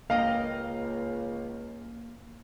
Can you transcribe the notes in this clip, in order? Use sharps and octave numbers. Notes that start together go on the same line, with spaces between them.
C#2 A#3 D#5 F5 G5 A#5